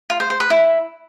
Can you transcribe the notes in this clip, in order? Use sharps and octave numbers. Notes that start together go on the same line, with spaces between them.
F4
C5
C5
B4
E4